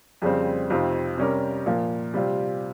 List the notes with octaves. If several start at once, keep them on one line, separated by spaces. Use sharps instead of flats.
F2 C#3 G3 C4
F2 C3 F3 C4 D#4
C3 G3 C#4 G4 A#4
A#2 F3 A#3
C3 G3 C4 F4